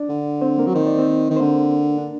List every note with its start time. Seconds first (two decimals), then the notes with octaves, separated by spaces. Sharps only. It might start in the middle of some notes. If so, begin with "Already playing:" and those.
Already playing: D4 D5
0.09 D3
0.41 C4 C5
0.58 A#3 A#4
0.67 F#3
0.75 D#3 C5
0.87 D5
0.99 C4 C5
1.31 D#3
1.36 C5
1.40 D3 A#3 A#4
1.98 D4